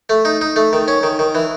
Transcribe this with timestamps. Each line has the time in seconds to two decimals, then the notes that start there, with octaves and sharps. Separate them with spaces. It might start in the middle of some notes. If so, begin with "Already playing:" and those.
0.10 A3
0.25 D#4
0.41 D#4
0.56 A3
0.73 D#3
0.88 C#4
1.03 D#3
1.19 D#3
1.35 E3